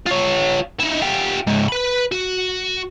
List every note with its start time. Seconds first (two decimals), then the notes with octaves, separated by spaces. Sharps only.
0.07 F4 C#5
0.80 D#4 E4
1.02 F4 G4
1.47 C#2 G#2
1.68 B4 B5
2.12 F#4